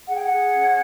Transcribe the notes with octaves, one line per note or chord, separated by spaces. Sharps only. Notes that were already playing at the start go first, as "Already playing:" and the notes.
G#4 F#5
G5
F#5
G#4
C#4